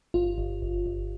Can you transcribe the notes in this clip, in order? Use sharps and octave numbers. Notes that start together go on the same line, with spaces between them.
G1 F4
G1
G1
G1